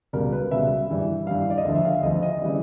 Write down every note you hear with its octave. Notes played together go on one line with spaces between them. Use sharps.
C#2 B2 G3 A#4
B4
C#2 B2 G3 E5
G2 E3 G3
G2 E3 G3 F5
D5
D#5
D2 D3 F3 E5
E5
F5
E5
D2 D3 F3 D#5
D#5
C#3 E3 G3